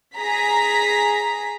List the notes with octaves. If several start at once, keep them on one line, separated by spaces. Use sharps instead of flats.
G#4 A#5 B6